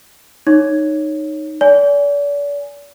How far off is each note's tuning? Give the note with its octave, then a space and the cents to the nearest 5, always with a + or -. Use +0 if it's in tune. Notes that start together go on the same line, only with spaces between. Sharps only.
D#4 -10 C#5 +0
D5 -40 G#5 +0